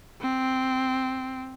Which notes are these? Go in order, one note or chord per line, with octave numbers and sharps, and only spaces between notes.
C4